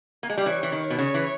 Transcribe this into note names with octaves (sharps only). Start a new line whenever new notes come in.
A#3
G#3
G3
E3 C#5
E3
D#3
B2
C#3 C#5
E3